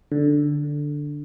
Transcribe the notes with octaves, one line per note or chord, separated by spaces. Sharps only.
D3